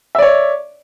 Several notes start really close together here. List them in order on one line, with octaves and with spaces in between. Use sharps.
E5 D5 C#5